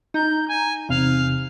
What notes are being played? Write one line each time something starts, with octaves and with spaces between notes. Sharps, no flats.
D#4 A#5 G6
G#5
E2 C3 F5